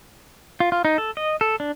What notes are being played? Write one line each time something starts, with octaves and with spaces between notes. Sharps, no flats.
F4
F4
D#4
A4
D#5
A4
D4